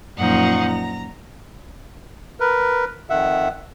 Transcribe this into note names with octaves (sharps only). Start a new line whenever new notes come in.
F#2 A#2 F3 D#4 F#5 C#6
A#5
A#4 B4
F2 D#3 E5 F#5